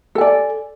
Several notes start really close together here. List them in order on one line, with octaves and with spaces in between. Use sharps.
A4 G#5 D5